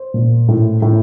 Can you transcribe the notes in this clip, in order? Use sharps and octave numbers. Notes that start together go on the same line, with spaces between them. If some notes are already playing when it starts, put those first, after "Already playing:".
Already playing: C5
A#2
A2
A2